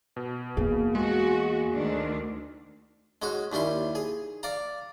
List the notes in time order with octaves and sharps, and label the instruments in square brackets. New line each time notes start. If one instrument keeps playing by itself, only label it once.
[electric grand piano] B2
[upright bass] E2 [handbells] A#3 G#4
[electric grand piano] G#3 [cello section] F#4
[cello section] D2 D#3 D4
[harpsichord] G#3 C#4 F#4
D#2 G3 C#4 E4 C6
G#4
D5 F5 A#5